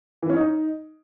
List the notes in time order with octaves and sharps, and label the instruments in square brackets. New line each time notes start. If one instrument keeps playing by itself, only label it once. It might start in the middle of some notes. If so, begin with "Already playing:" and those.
[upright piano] E3
C#4
D#4